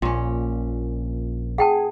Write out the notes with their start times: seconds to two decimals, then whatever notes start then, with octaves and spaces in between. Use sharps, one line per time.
0.02 A#1 A#2 C#4
1.58 G#4 F#5 G5 A5